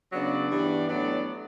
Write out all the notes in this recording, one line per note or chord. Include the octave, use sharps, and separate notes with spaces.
C#3 F#3 B3 D4 D5
G2 E3 G3 B3
A2 F#3 B3 D4 D5